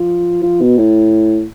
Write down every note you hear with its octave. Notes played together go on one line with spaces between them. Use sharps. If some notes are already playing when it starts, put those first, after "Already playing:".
Already playing: F3
F3
B2
A2